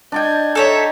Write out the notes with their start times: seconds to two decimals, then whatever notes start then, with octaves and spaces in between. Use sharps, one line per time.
0.12 D4 D5 D#5 G5 G#6
0.55 D#4 A4 C#5 E5